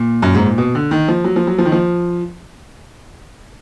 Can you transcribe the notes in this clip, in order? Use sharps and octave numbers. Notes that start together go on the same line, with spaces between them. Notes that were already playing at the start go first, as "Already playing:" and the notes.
Already playing: A#2
F#2
G#2
A#2
B2
D3
D#3
F3
F#3
F3
F#3
F3
D#3
F3